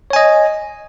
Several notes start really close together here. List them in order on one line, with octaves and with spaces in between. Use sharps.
C#5 G#5 D#5